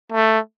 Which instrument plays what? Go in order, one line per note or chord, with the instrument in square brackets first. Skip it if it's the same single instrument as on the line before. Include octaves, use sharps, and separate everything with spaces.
[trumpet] A3